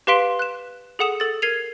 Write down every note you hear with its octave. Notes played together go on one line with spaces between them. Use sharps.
G4 B4 F5 C6 B6 D7
F#6 E7
G#4 A4 F#5 D#6 E7
A4 A6
A#4 G#6 C7 D#7 F7